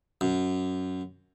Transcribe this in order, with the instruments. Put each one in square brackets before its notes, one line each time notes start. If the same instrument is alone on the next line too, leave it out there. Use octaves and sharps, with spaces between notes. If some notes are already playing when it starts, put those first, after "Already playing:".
[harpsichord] F#2